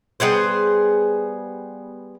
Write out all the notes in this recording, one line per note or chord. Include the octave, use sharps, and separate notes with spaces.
G3 B3 G#4 C5